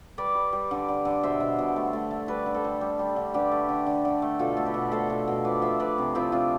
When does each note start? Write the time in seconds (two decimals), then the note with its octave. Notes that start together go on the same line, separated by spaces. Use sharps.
0.18 G3 B4 D5
0.35 G3
0.53 G3
0.71 D3
0.89 D3
1.05 D3
1.23 B2 C5 E5
1.40 B2
1.59 B2
1.76 A3
1.93 A3
2.11 A3
2.28 G3 B4 D5
2.46 D3
2.54 A4 C5
2.64 G3
2.81 G3
2.99 G3
3.16 D3
3.34 D3 G4 B4
3.52 A3
3.69 D3
3.86 D3
4.05 D3
4.22 A3
4.39 B2 F4 A4
4.57 A3
4.65 G4 B4
4.74 B2
4.92 A3 A4 C5
5.10 B2
5.28 B2
5.44 F3 B4 D5
5.61 F3 C5 E5
5.80 F3 B4 D5
5.98 C3
6.15 F3 C4 E4
6.32 C3 D4 F4